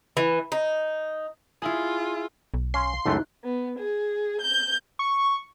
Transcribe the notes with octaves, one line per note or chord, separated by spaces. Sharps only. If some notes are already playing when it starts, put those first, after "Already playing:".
E3
D#4
E4 F4 G#4
B1
C#4 F5 C6
C#2 F#2 A3 D#4 E4 F#6
B3
G#4
G6
C#6